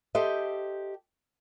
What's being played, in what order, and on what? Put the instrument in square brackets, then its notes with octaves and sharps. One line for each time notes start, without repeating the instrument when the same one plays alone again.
[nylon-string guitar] G4 A4 C5 D#5 E5